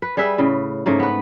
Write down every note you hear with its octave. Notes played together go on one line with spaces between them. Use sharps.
B4
G3 G#4 B4 E5
A2 C#3
G#2 C#3 A3 A#3
B3 B4